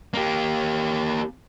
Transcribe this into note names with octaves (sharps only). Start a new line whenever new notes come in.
A#3 G4